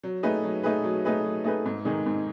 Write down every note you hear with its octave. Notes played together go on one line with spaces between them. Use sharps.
F#3
A3 D#4 G#4 B4
F#3
A3 D#4 G#4 B4
F#3
A3 D#4 G#4 B4
F#3
A3 D#4 G#4 B4
G#2
D#3 G#3 D#4 G#4
G#2